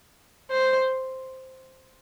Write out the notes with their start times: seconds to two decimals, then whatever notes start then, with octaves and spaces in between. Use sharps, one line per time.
0.51 C5